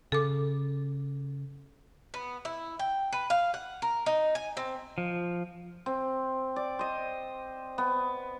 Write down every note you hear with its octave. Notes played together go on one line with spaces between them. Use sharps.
C#3 A4 D6
B3
E4
G5
B4
F5
F#5
A#4
D#4
G#5
C4
F3
C4
D5
C5 D#5
B3